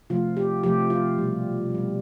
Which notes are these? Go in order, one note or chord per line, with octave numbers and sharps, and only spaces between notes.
C3 F3 A3 F4
G4
C3 F3 A3 G4
F4
B2 G3
B2 G3